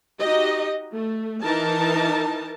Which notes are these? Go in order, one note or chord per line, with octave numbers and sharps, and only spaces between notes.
D#4 F#4 G4 D#5
A3
E3 D#4 A#4 A5